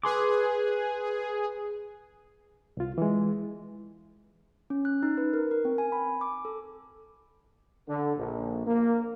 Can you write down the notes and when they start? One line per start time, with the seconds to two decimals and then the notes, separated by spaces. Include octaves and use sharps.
0.03 G#4 B4 C6 D6
2.77 C2 F4
2.98 E3 G#3
4.70 C#4
4.85 F#6
5.03 D#4
5.18 B4
5.33 A#4
5.51 A#4
5.65 C4
5.78 G#5
5.92 B5
6.21 D6
6.45 A4
7.88 D3
8.17 A#1
8.66 A#3